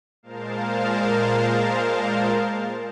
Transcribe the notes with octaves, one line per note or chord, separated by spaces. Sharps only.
A#2 G#3 A#4 C5 F5 A5